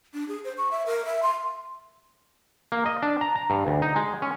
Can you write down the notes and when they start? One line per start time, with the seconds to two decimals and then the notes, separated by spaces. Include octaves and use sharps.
0.14 D4
0.28 G#4
0.45 C5
0.58 C#6
0.71 E5
0.86 A#4
1.06 E5
1.23 C6
2.72 A#3
2.86 D#5
3.02 D4
3.21 A#5
3.36 A#5
3.50 G2
3.67 D2
3.82 D#4
3.96 G#3
4.22 C#4